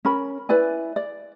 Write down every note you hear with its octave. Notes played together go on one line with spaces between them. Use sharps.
C#4 A#4 B5
E4 B4 D5 G#5
D5